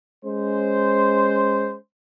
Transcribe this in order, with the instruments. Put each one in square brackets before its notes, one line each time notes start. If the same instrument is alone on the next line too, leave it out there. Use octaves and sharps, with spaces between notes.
[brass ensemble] G#3 C#4 C5